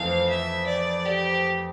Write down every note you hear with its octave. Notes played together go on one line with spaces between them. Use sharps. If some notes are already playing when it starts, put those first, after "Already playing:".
Already playing: F2 E3 A3 C4 F5
E5
D5
G4